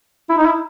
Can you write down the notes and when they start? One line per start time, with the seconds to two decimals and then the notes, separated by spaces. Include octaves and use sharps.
0.29 E4
0.38 D#4
0.46 E4